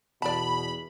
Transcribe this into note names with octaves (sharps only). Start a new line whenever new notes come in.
E2 B2 D5 A5 B5